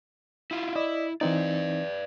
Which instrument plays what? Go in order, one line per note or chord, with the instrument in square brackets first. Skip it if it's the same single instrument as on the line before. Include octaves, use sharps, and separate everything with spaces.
[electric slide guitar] E4 F4
[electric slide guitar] E4 [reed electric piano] D5 D#5
[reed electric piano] E3 C4 D#4 [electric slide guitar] B4 D5